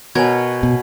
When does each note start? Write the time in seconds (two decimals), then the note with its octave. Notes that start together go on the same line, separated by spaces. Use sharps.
0.15 B2 A#4 C#5 G#5 G#6
0.63 B2